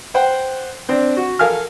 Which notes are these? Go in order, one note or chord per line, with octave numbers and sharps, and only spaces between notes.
C5 F#5 G5
C4 D4
F#4
A4 A#4 F5 G#5 F6